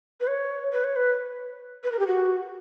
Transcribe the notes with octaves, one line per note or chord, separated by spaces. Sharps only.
B4
C#5
B4
C#5
B4
B4
A#4
G4
F#4